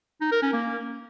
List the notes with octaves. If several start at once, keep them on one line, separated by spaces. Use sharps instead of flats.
D#4
A#4
C#4
A#3